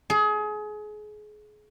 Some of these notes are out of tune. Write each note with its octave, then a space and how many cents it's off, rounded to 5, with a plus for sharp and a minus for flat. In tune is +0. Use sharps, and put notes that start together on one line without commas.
G#4 +30